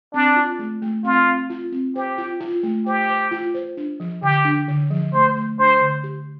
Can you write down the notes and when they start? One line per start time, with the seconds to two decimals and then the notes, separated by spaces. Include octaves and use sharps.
0.14 C4 D4
0.36 F4
0.59 A3
0.82 A3
1.04 C4 F4
1.27 C4
1.50 F4
1.72 C4
1.96 G4 C5
2.18 F4
2.40 F4
2.63 A3
2.86 G4 C5
3.09 C5
3.31 F4
3.54 C5
3.77 D4
4.00 F3
4.22 D3 G4
4.45 D4
4.68 D3
4.90 F3
5.13 A3 C5
5.36 A3
5.58 D4 C5
5.81 D3
6.04 G4